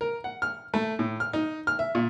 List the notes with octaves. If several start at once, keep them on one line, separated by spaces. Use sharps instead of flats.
A#4
F#5
F6
A3
A2
F6
D#4
F6
E5
A#2